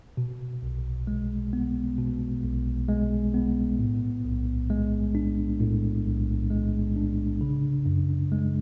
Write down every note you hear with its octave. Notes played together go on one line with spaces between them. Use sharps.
B2
B1
G#3
B3
B2
B1
G#3
B3
A2
B1
G#3
D4
A2
B1
G#3
D4
C#3
F#2
G#3